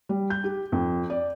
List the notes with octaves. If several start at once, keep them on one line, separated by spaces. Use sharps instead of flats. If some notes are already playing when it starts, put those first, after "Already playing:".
G3
G6
G4
F2
D5